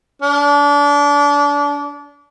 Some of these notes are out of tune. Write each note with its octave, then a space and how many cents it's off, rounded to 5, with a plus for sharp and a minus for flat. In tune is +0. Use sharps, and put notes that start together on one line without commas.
D4 -30